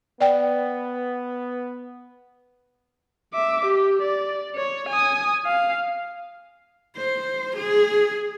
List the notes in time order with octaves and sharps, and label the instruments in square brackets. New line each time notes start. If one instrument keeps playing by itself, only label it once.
[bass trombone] B3 [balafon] D5 G5
[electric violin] E5 D6
G4
D5
C#5
G#5 D#6
F5
[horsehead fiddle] C5
G#4